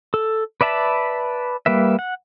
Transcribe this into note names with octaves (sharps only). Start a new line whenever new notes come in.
A4
B4 D5 E5 A5 B5
G3 A#3 B4 E5
F#5